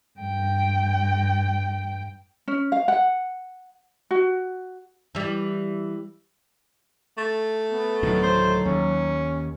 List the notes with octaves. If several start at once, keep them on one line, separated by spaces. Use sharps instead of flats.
G2 G5
C#4
F5
F#5
F#4
E3 G3
A3
B3
D2 A2 D#3 F#3
C5
D#2 C#4